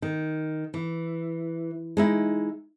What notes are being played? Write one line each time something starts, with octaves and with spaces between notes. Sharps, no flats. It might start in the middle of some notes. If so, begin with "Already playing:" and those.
D#3
E3
G#3 D#4 E4